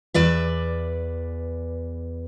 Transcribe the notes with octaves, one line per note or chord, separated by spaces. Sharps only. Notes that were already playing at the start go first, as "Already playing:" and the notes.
E2 B4 D5 E5